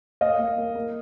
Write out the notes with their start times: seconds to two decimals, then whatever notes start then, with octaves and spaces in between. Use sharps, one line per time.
0.21 A#3 D#5 F5
0.39 A#3
0.58 A#3
0.75 A#3